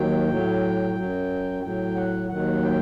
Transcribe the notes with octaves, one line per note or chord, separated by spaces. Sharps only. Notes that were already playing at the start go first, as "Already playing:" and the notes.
Already playing: D#2 D#3 F#3 G5
A2 F#3
F#2 F#3
A2 F#3 G5
F#5
D#2 D#3 F#3 F#5
G5